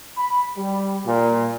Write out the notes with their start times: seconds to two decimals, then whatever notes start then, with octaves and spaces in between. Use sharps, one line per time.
0.17 B5
0.58 G3
1.05 A#2